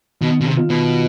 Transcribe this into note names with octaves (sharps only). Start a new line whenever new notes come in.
B2 D#3
B2
C3
F4
B2